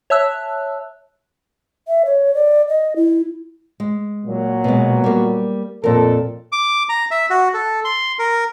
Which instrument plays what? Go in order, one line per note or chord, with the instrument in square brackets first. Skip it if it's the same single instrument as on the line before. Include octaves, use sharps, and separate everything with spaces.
[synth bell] C#5 E5 A5 E6 F#6
[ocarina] E5
C#5
D5
D#5
E4
[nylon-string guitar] G#3
[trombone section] A#2 F#3
[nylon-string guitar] B2 G#3
G3 A#3
[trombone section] F2 A4 [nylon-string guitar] A#2 A#4
[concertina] D6
A#5
E5
F#4
A4
C6
A#4